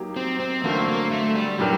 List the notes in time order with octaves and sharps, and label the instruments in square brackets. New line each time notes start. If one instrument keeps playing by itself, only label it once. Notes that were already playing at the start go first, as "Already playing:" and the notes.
Already playing: [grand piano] F#3 A#3 D#4 G4
[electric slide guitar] C4
C4
[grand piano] D3 F#3 A3 C4 [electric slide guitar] A#3
[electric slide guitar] A#3
A3
G3
[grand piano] A2 G3 D4 G4 A#4 [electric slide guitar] F#3